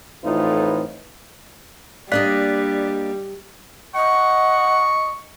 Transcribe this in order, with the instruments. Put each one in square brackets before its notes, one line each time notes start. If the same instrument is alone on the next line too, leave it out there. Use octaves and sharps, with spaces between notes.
[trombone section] F2 A2 E3 D#4 F4 B4
[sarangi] G3 [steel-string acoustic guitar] A#3 D4 D#5 [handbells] D5 F#6 B6
[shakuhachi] D#5 [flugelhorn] F#5 [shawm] C#6